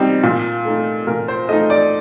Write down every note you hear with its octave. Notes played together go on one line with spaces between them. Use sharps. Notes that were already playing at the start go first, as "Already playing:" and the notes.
Already playing: A#2 G3 C4 D#4
A#2
A3 D#4
A#2 A#4
C5
A3 D#4 D#5
D5